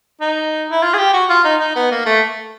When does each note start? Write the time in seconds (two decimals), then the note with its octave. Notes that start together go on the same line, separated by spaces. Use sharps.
0.21 D#4
0.71 E4
0.83 F4
0.94 G#4
0.98 G4
1.14 F#4
1.30 F4
1.44 D#4
1.60 D#4
1.76 B3
1.91 A#3
2.06 A3